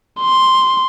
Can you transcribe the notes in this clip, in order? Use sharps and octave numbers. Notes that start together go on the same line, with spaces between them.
C6